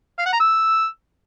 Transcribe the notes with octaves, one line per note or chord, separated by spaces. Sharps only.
F5
F#5
A#5
E6